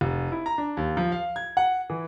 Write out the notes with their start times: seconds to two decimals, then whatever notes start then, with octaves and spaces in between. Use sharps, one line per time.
0.01 F1
0.32 E4
0.46 A#5
0.58 D4
0.77 D#2
0.97 F3
1.12 F5
1.36 G#6
1.57 F#5
1.90 E3